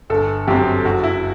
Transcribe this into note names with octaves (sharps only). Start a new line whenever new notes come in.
G1 A4
F#2 F#3 C4 G4
F#1 F#4
E4